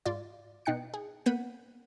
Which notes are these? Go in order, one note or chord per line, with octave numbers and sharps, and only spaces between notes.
G#2 F4 D5
B2 D#4 G5 F#6 C#7
G#4
A#3 B3 F#5 G6 B6 D#7